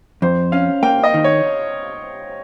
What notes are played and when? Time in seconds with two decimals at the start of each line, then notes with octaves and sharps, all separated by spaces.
0.22 F2 C5
0.52 C#4 F5
0.83 A#3 G5
1.04 D#5
1.14 D#3
1.24 C#5